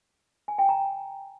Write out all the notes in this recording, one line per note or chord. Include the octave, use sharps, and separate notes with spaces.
G#5
G5
A#5